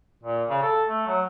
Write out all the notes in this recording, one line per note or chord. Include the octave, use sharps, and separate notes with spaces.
A#2
C#3
A4
A3
F#3